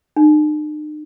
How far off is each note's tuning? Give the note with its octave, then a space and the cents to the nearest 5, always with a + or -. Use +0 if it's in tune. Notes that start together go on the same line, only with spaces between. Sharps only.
D#4 -45